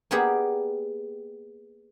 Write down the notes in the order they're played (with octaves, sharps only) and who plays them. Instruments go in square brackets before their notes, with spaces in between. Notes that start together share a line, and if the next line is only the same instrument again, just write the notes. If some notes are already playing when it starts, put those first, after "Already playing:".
[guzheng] A#3 B3 G4 G#4 D5 F#5